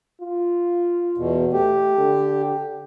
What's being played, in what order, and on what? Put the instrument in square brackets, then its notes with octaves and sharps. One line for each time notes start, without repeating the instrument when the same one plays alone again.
[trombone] F4
[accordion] E2 B2
[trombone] A3 [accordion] G4
[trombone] D3